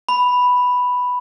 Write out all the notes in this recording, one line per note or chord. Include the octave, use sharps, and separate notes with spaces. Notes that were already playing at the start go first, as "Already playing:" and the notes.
B5